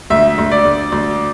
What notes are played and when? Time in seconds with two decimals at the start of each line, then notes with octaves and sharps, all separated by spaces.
0.10 D2 E5
0.38 D2
0.52 D5
0.65 D2
0.92 D2